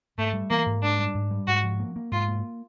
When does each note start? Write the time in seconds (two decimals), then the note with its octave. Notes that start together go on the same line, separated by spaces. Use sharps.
0.18 G#2 A3
0.33 G3
0.50 E3 A#3
0.66 G#2
0.82 G#2 D4
0.98 G3
1.15 G#2
1.31 G3
1.47 G#2 F#4
1.63 F3
1.80 A#3
1.96 A#3
2.12 G#2 F4
2.28 A#3